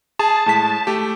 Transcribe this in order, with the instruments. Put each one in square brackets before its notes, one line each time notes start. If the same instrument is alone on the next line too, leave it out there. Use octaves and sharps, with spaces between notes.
[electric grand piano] G#4 [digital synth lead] A5
[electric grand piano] A2 G#3 B6
A3 G4